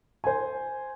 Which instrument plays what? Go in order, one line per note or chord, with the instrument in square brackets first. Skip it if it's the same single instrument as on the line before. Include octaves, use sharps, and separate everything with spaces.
[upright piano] C5 G#5